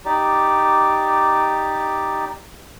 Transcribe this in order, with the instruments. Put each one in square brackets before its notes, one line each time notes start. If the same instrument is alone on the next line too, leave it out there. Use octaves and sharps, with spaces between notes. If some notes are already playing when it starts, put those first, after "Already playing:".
[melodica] D#4 G4 D5